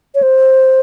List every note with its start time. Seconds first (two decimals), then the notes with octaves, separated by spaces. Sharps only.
0.15 C#5
0.22 C5